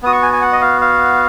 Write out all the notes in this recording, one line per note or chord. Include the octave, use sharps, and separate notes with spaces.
B3 F#4 D#6
C#6
G#5
G#5
F#5
D#5
F5
F5